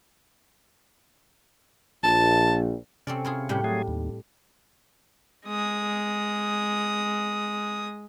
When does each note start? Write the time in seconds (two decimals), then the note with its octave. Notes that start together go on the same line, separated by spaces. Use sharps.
2.03 A#1 A5
3.07 C3 C4 C#4 A4 D5
3.25 E4 F4 G#4
3.49 A2 G3 G4
3.64 F#3 A3 G#4
3.88 D#2
5.46 G#3 D#6